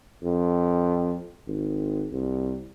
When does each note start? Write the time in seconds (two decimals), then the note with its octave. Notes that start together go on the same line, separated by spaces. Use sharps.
0.24 F2
1.48 G#1
2.12 C2